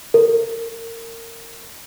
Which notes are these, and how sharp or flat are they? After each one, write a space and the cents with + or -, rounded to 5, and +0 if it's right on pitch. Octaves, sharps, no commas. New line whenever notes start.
A#4 -25